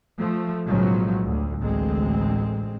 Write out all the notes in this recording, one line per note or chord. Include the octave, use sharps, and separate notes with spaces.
F3 A3
B1 A2 C#3 F3 F#3 G#3
D2
A1 D2 G#3 C4